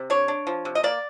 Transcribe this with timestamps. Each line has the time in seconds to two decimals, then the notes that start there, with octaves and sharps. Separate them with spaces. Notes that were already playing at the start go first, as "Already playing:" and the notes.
Already playing: C3
0.10 D4 C#5
0.28 D4
0.47 F3
0.65 C3
0.75 D#5
0.83 A#3 D5